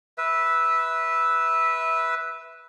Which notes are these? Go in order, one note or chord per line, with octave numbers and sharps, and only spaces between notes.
B4 E5